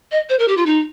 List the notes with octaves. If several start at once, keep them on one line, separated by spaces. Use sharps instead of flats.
D#5
C5
A#4
G4
F4
D#4